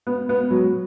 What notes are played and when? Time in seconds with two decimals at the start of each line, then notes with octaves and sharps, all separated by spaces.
0.07 B3
0.29 B3
0.51 F#3